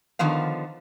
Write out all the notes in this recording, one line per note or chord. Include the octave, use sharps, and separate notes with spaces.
D3 D#3 F3 B3 F5